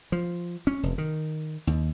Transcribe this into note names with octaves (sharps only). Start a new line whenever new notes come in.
F3
C#4
F1
D#3
D#2